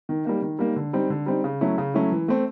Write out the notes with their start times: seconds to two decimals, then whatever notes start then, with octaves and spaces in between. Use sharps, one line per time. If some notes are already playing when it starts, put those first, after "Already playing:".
0.09 D#3
0.25 G3 A#3 D#4
0.42 D#3
0.59 G3 A#3 D#4
0.76 D3
0.93 G3 C4 D#4
1.10 D3
1.26 G3 C4 D#4
1.44 C#3
1.61 F#3 A3 C#4 E4
1.78 C#3
1.94 F#3 A3 C#4 E4
2.12 E3
2.28 A3 C4